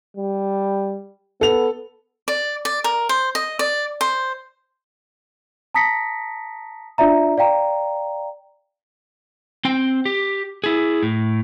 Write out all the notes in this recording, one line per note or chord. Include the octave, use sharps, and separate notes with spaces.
G3
B3 A4 F7
D5
D5
A#4
C5
D#5
D5
C5
A5 A#5 D#6 A#6 B6 C#7
D4 F4 D5 E5 A#5
D5 F5 G5 A#5
C4 G5
G4
E4 G#4
A2